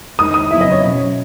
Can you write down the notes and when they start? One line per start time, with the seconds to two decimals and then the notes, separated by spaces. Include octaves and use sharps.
0.18 D#3 G#3 D#4 D#6
0.34 D#6
0.50 C#3 F#3 B3 E4 E5
0.61 D#5
0.72 C#5
0.82 B2 F#3 C#4